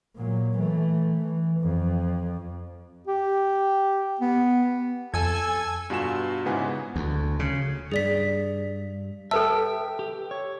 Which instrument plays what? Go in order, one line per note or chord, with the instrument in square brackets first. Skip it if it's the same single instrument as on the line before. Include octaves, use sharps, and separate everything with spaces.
[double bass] A#2 F#3
E3 A3
E3
F2
[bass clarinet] G4
B3
[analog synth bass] F2 [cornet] A4 [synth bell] G#5 E6 G#6
[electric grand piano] G2 B2 F4 F#4 G#5 E7
G#2 C#3 B3 E4 F#5 G#5
[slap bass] D2
C#3
[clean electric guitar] G2 [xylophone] G#4 D5 B6
[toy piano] A4 B4 A5 [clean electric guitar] E5 G5 [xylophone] E6
[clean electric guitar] G4
C#5